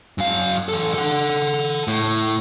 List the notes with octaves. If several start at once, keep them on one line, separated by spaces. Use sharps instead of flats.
F#2 F5
E3 A4
A4 F#5
A2